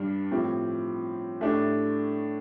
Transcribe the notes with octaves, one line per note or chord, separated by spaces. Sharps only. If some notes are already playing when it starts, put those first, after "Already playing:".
Already playing: G2 G3 D4
A2 F3 C4 G4
A2 A3 D4 G4